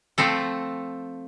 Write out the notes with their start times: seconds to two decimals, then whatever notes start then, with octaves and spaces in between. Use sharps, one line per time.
0.18 F3 A3 C4 A4